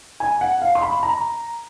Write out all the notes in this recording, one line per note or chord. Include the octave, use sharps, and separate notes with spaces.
G#5
F#5
F5
C6
B5
A#5